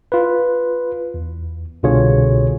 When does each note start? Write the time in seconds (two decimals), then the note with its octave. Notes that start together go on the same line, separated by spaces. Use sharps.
0.12 F4 B4
1.14 E2
1.83 C2 B2 D3 F4 G#4 C#5